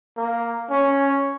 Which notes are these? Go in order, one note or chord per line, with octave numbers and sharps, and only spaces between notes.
A#3
C#4